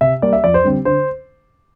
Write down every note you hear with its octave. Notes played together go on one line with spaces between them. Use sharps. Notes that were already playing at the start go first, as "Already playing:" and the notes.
C3 E5
G3 A#3 D5
E5
F2 D5
C5
D3 G3 C4
D3 C5